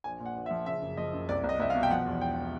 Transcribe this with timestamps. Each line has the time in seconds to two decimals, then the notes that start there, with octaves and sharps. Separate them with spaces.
0.04 A#1 G#5
0.20 A#2
0.26 F#5
0.36 A#1
0.46 E5
0.51 F3
0.66 C#3 E5
0.82 F#1
0.97 F3 D#5
1.13 F#1
1.29 C2 D5
1.44 C2
1.49 D#5
1.60 C2 E5
1.70 F5
1.75 B2
1.83 G5
1.90 F3 F#5
2.06 E2
2.21 E1 G5